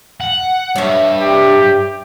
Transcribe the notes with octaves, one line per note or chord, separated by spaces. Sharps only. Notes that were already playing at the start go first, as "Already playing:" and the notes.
F#5
G2 C#5 E5
G4